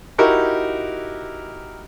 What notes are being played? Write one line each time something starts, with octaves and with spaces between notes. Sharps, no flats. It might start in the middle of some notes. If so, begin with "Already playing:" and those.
D#4 E4 F#4 G4 A#4